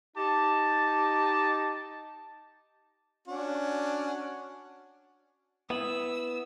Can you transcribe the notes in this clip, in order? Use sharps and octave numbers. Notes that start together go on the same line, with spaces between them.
D#4 G4 A5
C#4 D4 F#4
B3 E4 D#6 E6 F#7